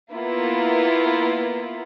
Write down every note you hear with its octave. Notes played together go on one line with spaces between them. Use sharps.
A#3 B3 E4 F4